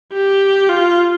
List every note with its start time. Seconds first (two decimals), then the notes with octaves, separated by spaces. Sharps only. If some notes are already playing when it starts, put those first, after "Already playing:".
0.13 G4
0.69 F4